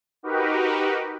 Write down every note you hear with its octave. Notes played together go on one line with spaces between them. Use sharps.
D#4 F#4 G4 A#4 B4